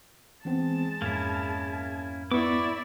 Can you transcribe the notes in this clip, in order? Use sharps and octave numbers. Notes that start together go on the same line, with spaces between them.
E3 G#3 B3 C4 A5
F2 G#2 A#3 C#4 E4
B3 E4 D5 C#6 D6